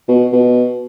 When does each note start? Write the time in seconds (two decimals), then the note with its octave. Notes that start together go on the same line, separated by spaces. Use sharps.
0.08 B2
0.32 B2